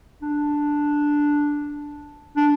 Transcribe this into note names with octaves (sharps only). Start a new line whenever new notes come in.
D4
D4